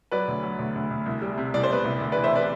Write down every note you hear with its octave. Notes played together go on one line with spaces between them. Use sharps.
F#3 B4 D5
D2
F#3
D2
D2
D2
C2
G3
C3
C2 D5
C5
C2 B4 D5
C2
D2
B4 D5
E3
C5 E5
C3 B4 D5